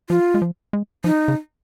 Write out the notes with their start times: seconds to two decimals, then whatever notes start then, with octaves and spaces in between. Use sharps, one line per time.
0.10 F3 F4
0.34 G#3
0.42 F3
0.73 G#3
1.04 F3 D#4
1.28 C#3